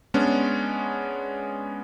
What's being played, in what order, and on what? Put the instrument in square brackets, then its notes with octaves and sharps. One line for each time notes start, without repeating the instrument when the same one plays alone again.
[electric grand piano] G#3 B3 C#4 D4